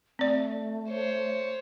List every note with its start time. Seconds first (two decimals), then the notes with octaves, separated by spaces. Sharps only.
0.19 A3 C4 D5
0.89 C5 C#5